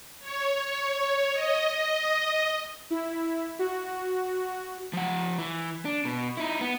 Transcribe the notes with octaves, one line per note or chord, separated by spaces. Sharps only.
C#5
D#5
E4
F#4
F3 F#5
E3
D4
B2
D#4 E4
B3